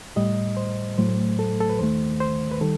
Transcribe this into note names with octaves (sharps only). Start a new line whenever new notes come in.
A2 G3 D#5
C5
A2 F#3 A3 C5
A4
A4
B4
D#2 D#3 A3 C5
C5
B4
D#3 G3 A4